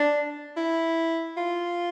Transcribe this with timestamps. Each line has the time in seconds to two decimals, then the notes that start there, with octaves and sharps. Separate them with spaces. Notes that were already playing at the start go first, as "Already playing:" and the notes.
Already playing: D4
0.57 E4
1.37 F4